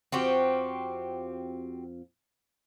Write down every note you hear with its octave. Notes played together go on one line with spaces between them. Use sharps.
F2 F3 C4 F#4 G4